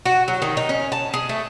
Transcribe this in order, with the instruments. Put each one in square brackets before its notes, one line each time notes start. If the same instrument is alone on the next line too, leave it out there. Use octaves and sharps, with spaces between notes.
[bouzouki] F#4
F#3
D#3
D#4
C#4
A5
G#4
A3